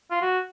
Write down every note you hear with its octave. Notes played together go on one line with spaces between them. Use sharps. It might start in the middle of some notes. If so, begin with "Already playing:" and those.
F4
F#4